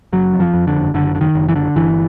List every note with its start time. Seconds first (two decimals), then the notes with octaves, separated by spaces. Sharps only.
0.13 F#1 F#3
0.34 F2
0.40 F3
0.54 F2
0.67 D3
0.74 F#1
0.94 F#1 D3
1.15 D3
1.21 D#3
1.35 F#1
1.49 E3
1.56 D3
1.76 G1 E3